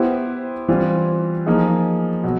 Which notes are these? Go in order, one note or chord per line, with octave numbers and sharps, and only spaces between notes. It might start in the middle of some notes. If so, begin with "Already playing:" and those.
Already playing: B3 E4 G4 C5
E3 G3 C4 F4
F3 A#3 D#4 G#4
B2 F#3